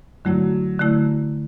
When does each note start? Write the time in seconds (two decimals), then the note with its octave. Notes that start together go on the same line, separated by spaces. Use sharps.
0.25 D3 F#3 A3 E4
0.80 D3 A3 E4